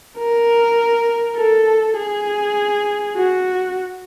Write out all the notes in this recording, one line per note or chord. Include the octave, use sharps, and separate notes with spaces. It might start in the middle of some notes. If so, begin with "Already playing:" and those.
A#4
A4
G#4
F#4